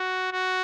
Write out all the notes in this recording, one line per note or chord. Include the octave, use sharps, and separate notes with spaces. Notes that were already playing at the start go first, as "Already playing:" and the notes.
Already playing: F#4
F#4